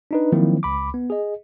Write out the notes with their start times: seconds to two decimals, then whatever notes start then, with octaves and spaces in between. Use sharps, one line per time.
0.11 D4 D#4 B4
0.32 D#3 F3 F#3 A#3 C4 E4
0.63 C#2 B5 D6
0.94 B3
1.10 G#4 D#5